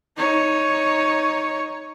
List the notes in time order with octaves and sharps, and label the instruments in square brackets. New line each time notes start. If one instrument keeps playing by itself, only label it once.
[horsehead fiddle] D#4 C#5